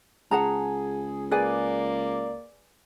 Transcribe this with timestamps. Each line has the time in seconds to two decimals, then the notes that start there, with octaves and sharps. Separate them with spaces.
0.31 C#2 G#4 F#5 A5 A#5
1.31 A#3 G#4 B4 D5 G#5